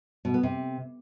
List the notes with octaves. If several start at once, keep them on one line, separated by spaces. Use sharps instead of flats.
B2
B3
C3